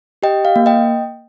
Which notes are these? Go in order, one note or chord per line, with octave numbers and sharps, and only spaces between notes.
G4 D#5 G5
F5
A#3
D#5 G5